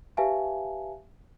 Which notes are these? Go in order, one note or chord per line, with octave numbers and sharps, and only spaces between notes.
G4 B4 E5 F5 G#5 A5